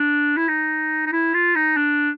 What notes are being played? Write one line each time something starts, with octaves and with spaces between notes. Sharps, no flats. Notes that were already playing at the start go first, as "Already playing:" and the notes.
Already playing: D4
E4
D#4
D#4
E4
F4
D#4
D4